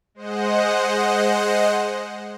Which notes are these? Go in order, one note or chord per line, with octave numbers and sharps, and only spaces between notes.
G#3 C5 D#5 F#5